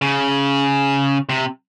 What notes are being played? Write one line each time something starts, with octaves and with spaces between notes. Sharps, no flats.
C#3
C3